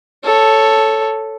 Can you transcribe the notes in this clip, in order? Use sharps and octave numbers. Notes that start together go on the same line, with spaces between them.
A4 C#5